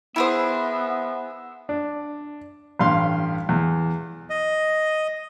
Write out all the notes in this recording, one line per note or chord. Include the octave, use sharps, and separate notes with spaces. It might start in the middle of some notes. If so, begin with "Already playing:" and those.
B3 E4 G#4 C5 E5 F#5
D4
A1 G2 F5 C6
E2
D#5